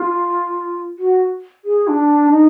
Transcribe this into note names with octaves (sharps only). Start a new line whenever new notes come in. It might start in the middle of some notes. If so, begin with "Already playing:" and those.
Already playing: F4
F#4
G#4
D4
D#4